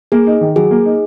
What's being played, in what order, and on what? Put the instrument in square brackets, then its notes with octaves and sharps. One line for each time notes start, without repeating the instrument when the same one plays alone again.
[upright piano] A#3 [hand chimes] G#4
[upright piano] D#4
D#3
[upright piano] F#3 [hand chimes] G#4
[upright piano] A#3
D#4